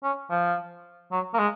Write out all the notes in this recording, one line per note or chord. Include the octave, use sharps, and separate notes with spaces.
C#4
F3
F#3
A#3
G#3